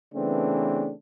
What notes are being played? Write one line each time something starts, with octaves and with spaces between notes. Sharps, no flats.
C#3 E3 A3 B3 C4 D4